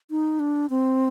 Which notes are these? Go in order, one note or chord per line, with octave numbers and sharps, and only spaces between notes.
D#4
D4
C4